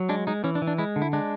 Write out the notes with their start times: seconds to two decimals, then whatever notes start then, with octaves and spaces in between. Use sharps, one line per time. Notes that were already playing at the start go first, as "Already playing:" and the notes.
Already playing: F#3
0.09 G#3 D4
0.27 G#3 D#4
0.44 E3 C#4
0.55 D4
0.62 E3
0.67 D4
0.78 G#3 E4
0.96 D3
1.02 E4
1.13 G#3 D4